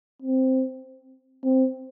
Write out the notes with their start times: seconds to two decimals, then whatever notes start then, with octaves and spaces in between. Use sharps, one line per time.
0.22 C4
1.44 C4